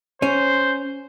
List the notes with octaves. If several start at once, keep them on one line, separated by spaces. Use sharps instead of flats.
C#4 C5